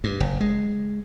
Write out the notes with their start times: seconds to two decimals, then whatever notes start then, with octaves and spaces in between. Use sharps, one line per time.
0.04 G2
0.20 F#1
0.40 G#3